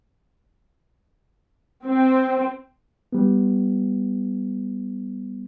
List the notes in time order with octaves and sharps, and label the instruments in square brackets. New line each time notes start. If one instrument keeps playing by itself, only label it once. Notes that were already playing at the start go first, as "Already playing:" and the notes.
[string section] C4
[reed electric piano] G3 B3